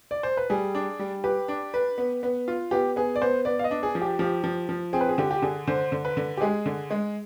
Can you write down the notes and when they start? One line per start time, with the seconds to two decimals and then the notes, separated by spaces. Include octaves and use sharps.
0.11 D5
0.23 C5
0.37 B4
0.50 G3 G#4
0.75 D4
0.99 G3
1.24 G4 B4
1.48 D4
1.74 B4
1.98 B3
2.23 B3
2.48 F4
2.71 B3 G4
2.96 B3 G#4
3.16 D5
3.22 B3 C5
3.45 B3 D5
3.59 F5
3.64 D#5
3.71 D4
3.83 G#4
3.95 F3
4.02 G4
4.19 F3 G4
4.44 F3
4.69 F3
4.93 C4 G#4
5.01 B4
5.09 G#4
5.18 D3 G4
5.31 G4
5.42 D3 G#4
5.67 D3 C5
5.92 D3
6.05 B4
6.17 D3
6.37 G4
6.41 G#3 G#4
6.66 D3
6.90 G#3